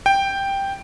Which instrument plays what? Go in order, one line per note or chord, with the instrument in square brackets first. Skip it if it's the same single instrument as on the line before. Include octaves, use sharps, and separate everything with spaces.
[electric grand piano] G5